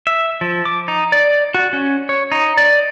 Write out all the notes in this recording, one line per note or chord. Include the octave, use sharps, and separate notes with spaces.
E5
F3
D6
D#4
D5
F#4
C#4
C#5
D#4
D5